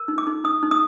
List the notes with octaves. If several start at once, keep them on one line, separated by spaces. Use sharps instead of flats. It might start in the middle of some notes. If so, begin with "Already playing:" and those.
Already playing: A#4
D#4
D6
D#4
D#4 D#6
D#4
D#6